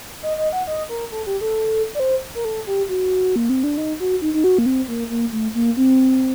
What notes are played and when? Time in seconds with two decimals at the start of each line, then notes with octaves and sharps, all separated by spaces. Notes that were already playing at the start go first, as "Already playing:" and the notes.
0.23 D#5
0.38 D#5
0.53 F#5
0.67 D#5
0.89 A#4
1.12 A4
1.26 G4
1.41 A4
1.95 D5
2.00 C5
2.35 A#4
2.45 A4
2.67 G4
2.89 F#4
3.36 A#3
3.49 C4
3.64 D4
3.77 D#4
4.00 F#4
4.22 D#4
4.34 D#4
4.44 F#4
4.58 A#3
4.66 C4
4.88 A#3
5.10 A#3
5.33 A3
5.55 A#3
5.77 C4